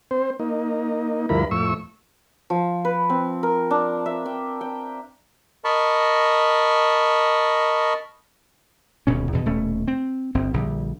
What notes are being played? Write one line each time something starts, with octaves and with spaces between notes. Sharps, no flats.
C4 C5
A#3 D#4
D2 G2 F3 E4 A#4 B5
F2 A2 C#6 E6
F3
B4
C4
A#4
D4
E5
G5
G5
A#4 D#5 A5 B5 C#6
D#1 D2 B2 C#4
E2 B2 D#3
D#1 B2 A3 C#4
C4
G1 C4
A#1 D3 G3